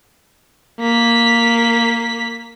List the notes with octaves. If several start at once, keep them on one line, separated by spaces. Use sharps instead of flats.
A#3 B6